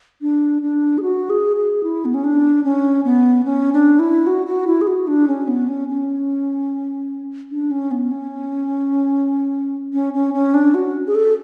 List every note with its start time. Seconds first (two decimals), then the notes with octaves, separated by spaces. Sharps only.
0.22 D4
0.62 D4
0.98 G#4
1.02 F#4
1.30 G#4
1.57 G#4
1.83 E4
2.05 B3
2.14 C#4
2.24 D4
2.64 C#4
3.05 B3
3.46 C#4
3.73 D4
3.99 E4
4.27 F#4
4.47 F#4
4.67 E4
4.81 G#4
4.87 F#4
5.07 D4
5.28 C#4
5.48 B3
5.68 C#4
5.89 C#4
7.51 D4
7.71 C#4
7.91 B3
8.11 C#4
9.93 C#4
10.14 C#4
10.34 C#4
10.54 D4
10.74 F#4
11.07 G#4
11.15 A4